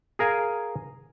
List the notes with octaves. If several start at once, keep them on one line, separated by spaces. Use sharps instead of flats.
G#4 A#4 F5 G#5